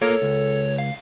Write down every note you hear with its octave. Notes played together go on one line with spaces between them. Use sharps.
A#3 F4 A4 A#4 C#5
C#2
F5